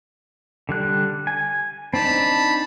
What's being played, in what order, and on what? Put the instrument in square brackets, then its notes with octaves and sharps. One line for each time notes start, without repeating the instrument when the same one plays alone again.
[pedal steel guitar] D3 G3 F#6
G#5
[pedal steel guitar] C4 D4 D#4 [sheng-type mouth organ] A5 B5